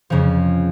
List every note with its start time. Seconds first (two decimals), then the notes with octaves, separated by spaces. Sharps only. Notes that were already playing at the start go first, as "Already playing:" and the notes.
0.10 F2 C#3 F3